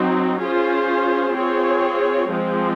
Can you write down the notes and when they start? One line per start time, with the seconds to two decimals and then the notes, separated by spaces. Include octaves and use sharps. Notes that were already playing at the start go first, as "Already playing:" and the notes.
Already playing: F#3 C4 D#4
0.40 C#4 F4 G#4 C5
1.35 C4 F4 G#4 C#5
2.30 F3 G#3 C4 F4